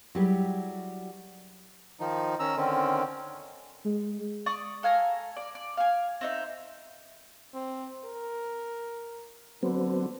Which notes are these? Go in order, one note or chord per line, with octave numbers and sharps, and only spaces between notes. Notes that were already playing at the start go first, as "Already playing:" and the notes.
F#3 G3 E4 G4 G#4 B4
D#3 F3 D#4
D#3 C#4 A#5 E6
D3 D#3 C4 C#4
G#3
D5 C#6 D#6
A4 F5 G#5 A#5
D5
D5
F5 G#5
C4 D#4 E5
C4
A#4
D3 F#3 B3 C4